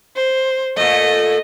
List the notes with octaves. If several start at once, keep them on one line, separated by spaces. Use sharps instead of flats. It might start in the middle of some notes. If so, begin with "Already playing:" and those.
C5
A#2 A3 D#5